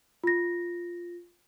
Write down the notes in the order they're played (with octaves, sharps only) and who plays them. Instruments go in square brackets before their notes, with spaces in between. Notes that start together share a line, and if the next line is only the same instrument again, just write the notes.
[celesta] F4 A#6